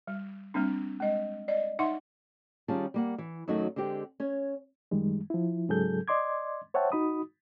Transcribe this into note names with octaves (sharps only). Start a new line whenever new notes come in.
G3
G3 A#3 C4 D4
G#3 D#5
D5 D#5
D#4 E5 F#5 C6
D#3 G3 C#4 F4 G#4 A5
G3 A#3 F#5
E3
F#2 D#3 F#3 A3 D#4 F#4
D3 G#3 C4 G4
C#4 C#5
F#2 D#3 G3 G#3
F3 E4
G#2 C#3 F#3 G#4 A4 G6
D5 D#5 C6 D6 G#6
C5 C#5 E5 F#5 G5 A5
D#4 F#4 B5 D#6